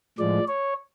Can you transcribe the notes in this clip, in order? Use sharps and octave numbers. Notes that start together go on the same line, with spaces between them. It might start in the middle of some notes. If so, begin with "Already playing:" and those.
A2 F3 G#3 D5
C#5